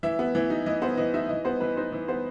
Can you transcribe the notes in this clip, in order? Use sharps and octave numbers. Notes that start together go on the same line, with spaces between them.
E3 E5
B3
E3
D#4
E3 D#5
B3 C5
E3 D#5
D#4 E5
E3 D#5
B3 C5
E3 B4
D#4 C5
E3
B3 C5